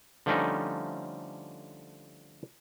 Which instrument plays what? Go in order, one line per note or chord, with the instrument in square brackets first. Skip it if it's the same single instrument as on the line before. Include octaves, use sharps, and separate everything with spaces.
[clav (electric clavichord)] D3 F3 G3 A3 C#4 D#4